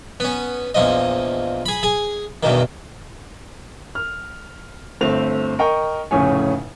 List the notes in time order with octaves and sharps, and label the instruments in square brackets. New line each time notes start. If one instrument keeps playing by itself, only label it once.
[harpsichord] B3 C#4
A#1 E2 F3 D#5
G#4 B5
G#4 G#5
E2 G2 B2 D#3
[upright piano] F6
G1 A3 C4 F7
A#4 D#5 G5 C#6
F1 A2 C#3 C#4 C#5 G#5